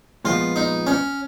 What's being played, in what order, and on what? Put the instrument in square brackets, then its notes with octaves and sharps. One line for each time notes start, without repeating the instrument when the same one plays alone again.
[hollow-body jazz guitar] A#2 F3 G#3 B3 [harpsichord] F4
[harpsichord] D#4
C#4